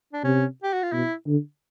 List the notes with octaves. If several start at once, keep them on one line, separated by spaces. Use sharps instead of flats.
D4
C3 C#4
G4
F#4
F4
B2 E4
D3